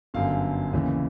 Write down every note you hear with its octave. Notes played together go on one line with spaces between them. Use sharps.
G1 F#2 D3 F5
D#2 C#3 E3